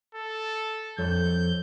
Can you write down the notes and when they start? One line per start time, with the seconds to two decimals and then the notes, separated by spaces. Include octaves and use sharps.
0.15 A4
0.98 F2 A4 C#5 G6